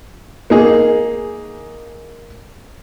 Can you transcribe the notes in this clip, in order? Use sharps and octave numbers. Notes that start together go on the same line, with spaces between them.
A#3 D#4 G#4